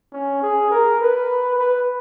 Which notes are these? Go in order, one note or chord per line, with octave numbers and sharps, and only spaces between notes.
C#4
G#4
A#4
B4
B4